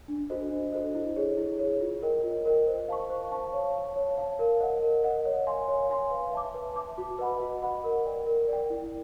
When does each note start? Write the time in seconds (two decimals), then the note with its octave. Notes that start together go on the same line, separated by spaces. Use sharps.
0.08 D4
0.30 F#4 A4 C5 D#5
0.51 D4
0.72 F#4 A4 C5 D#5
0.95 E4
1.16 G#4 C#5
1.37 E4
1.59 G#4 C#5
1.81 F4
2.02 A#4 D#5 G5
2.24 F4
2.45 A#4 D#5 G5
2.67 C5
2.88 F5 A5 C#6
3.10 C5
3.32 F5 A5 C#6
3.53 C#5
3.74 F5 A5
3.96 C#5
4.17 F5 A5
4.39 A#4
4.60 D#5 F#5
4.82 A#4
5.04 D#5 F#5
5.25 C#5
5.47 F5 G#5 C6
5.68 C#5
5.90 F5 G#5 C6
6.11 B4
6.33 E5 A5 D6
6.54 B4
6.76 E5 A5 D6
6.98 F#4
7.19 B4 D#5 F#5 B5
7.40 F#4
7.62 B4 D#5 F#5 B5
7.84 A#4
8.05 D5 G5
8.27 A#4
8.48 D5 G5
8.70 E4